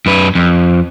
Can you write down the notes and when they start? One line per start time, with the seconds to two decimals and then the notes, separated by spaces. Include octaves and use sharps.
0.06 F#2 B4
0.35 F2